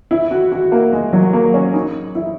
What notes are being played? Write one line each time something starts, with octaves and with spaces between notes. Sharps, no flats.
E4
F#4
F#4
A#3
G#3
F#3
A#3
C#4
D#4
E4